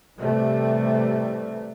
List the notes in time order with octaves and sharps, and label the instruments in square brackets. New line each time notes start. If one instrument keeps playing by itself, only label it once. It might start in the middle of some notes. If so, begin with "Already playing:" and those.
[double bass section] A2 C3 E3 G3 A3